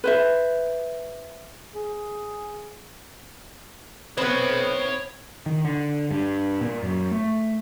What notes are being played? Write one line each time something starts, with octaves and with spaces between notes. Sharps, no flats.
B4 C5 E5
G#4
B3 C4 C#5 B5
D#3
D3
G2
A#2
F#2
A3